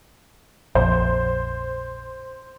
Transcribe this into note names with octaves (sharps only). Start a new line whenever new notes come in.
A#1 F2 C5